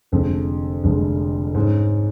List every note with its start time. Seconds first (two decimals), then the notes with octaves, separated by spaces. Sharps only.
0.12 F1 F2 D3 G#3
0.84 F1 F2 D3 G#3
1.55 G#2 G#3 C#4